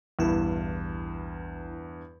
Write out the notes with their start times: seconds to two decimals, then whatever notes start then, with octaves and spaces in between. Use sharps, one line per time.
0.19 A#1 E2 G2 E4